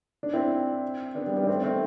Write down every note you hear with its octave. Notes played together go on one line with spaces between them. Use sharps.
D4
C4 E4
B3 D4
G3 B3
G3 B3
D4
A3 C4
A3 C4